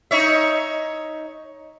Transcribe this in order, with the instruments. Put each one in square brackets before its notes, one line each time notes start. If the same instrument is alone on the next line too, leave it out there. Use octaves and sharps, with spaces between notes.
[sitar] D#4 C#5 E5